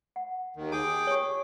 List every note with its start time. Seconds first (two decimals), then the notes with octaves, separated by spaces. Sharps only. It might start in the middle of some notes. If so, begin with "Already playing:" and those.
0.16 F#5
0.56 D#2 D#3
0.72 G#4 G5 A5 D6
1.07 G4 C#5